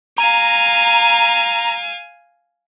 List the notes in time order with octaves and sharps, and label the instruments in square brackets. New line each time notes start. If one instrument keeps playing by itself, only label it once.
[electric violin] F5 G#5 [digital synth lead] A#5